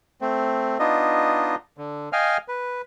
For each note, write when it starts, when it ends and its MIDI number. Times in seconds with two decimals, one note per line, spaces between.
0.21 0.78 57
0.21 0.78 60
0.79 1.55 59
0.79 1.55 62
0.79 1.55 63
0.79 1.55 65
0.79 1.55 75
1.78 2.09 50
2.13 2.37 75
2.13 2.37 77
2.13 2.37 79
2.13 2.37 80
2.13 2.37 89
2.48 2.82 71